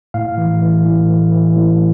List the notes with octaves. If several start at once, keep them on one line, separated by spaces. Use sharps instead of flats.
A2 F5
E3
E3
A2
E3
E3
A2